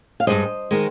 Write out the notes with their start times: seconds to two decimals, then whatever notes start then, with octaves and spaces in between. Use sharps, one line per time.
0.20 F5
0.27 G2 D#3 G#3 C5 D#5
0.71 D#3 G#3